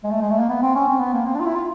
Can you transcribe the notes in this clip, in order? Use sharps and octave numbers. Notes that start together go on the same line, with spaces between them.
G#3
A3
G#3
A3
A#3
B3
C4
C#4
C4
B3
A#3
C4
D4
F4
E4
F4